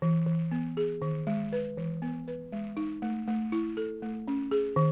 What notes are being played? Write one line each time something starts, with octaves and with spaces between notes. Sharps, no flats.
E3
E3
B3
G#4
D#3
G#3
B4
E3
B3
B4
G#3
D#4
A3
A3
E4
A4
A3
C#4
G#4
D#3